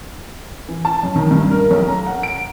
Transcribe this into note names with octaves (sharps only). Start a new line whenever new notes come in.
E3
A5
F#2
D#3
G2
A#4
B1
A#5
F#5
D7